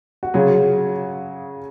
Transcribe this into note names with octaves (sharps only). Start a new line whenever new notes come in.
F#4
C#3 F#3 C#4 F4 G#4